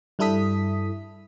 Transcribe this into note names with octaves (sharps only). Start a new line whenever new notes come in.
G2 G3 E4 A4 D#6 B6